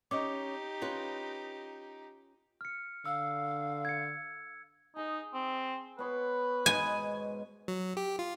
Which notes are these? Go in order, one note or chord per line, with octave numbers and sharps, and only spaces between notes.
C#4 D#4 G4 D#5 D6
C#4 F4 B4
F6 C#7
D3 F5 E6
G#6 C#7
D#4 G#4
C4
B3 B4 C#5 C6
G#2 B2 G#5 B5
F#3
G4
F4